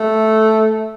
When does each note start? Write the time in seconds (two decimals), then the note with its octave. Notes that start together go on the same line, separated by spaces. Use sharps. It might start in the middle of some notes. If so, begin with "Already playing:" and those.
Already playing: A3